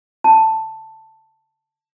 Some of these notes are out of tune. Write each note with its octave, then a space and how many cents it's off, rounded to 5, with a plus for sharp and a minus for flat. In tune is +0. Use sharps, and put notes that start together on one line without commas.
A5 +5